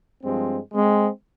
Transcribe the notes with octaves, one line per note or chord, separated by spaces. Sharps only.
G2 F3 G#3 C4
G#3 C4